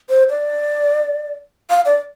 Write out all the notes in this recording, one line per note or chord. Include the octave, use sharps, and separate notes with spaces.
C5
D5
F5
D5